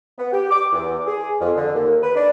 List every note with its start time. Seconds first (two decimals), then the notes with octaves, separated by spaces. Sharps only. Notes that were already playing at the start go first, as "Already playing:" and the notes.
0.18 B3
0.33 G4
0.50 D6
0.72 E2
1.07 G#4
1.40 F2
1.56 D3
1.74 D#2
2.02 B4
2.16 D4